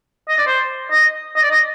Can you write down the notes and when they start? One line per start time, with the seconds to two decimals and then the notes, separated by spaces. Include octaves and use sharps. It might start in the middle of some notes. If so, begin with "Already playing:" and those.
0.29 D#5
0.38 D5
0.47 C5
0.91 D#5
1.36 D#5
1.43 D5
1.50 D#5